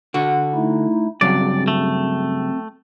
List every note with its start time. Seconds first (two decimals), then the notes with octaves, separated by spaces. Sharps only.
0.14 D3 F#4
0.54 A3 D#4 E4
1.21 G2 C#3 F#3 C4 D5
1.68 A3